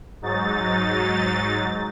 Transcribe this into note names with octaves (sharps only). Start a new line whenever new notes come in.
G#2 F#3 D#4 A6